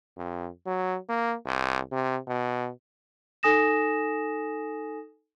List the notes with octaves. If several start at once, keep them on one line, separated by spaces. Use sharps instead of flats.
F2
F#3
A#3
C2
C3
B2
D#4 A4 G#5 D#6 A#6 E7